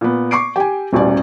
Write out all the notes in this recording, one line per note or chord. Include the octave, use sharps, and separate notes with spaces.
A#2 B3
C#6 D6 C7 D7
G4 G#5
D#1 A1 B2 G3 D5